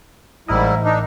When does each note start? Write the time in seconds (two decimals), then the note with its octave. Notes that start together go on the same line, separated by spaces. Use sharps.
0.48 A1 G#2 G3 E4 A#4 D#5
0.84 D4 D#4